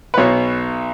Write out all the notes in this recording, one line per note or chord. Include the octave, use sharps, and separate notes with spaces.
B4
B1 B2 B3 C#5